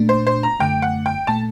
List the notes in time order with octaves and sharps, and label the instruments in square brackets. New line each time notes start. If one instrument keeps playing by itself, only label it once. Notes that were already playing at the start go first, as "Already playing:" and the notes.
Already playing: [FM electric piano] A#2 A3 D4
[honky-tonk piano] C5
C5
A#5
[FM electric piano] F#2 D3 A3 [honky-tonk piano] G5
[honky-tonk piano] F#5
G5
[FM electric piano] A#2 A3 [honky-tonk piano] A5